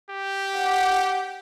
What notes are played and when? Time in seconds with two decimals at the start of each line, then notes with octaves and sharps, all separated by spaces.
0.11 G4
0.56 F#5